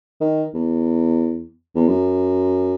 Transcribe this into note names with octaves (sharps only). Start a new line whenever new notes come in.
D#3
E2
E2
F#2